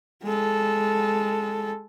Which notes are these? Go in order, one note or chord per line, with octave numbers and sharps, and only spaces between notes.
G#3 A4